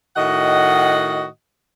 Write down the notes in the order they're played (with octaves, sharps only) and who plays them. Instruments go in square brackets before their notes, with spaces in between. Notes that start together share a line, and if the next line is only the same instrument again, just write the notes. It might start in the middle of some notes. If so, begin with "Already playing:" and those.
[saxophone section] A2 D#3 F#4 D#5 F#5